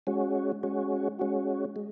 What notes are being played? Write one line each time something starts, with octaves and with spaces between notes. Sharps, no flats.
G#3 C#4 F#4
G#3 C#4 F#4
G#3 C#4 F#4
G#3